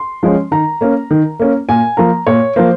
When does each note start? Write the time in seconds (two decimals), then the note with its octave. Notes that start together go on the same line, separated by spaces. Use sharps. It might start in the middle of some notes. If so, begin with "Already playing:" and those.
Already playing: C6
0.23 F3 G#3 C#4
0.51 D#3 A#5
0.81 A#3 C#4
1.10 D#3
1.40 A#3 C#4
1.69 A#2 G#5
1.97 F3 A#3 A#5
2.27 A#2 C#5
2.56 F3 A#3 C5